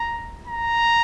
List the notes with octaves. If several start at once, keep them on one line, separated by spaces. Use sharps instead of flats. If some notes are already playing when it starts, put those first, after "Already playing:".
Already playing: A#5
A#5